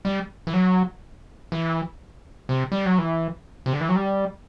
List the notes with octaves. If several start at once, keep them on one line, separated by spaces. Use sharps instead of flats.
G3
E3
F#3
E3
C3
G3
F#3
E3
C3
D3
E3
F#3
G3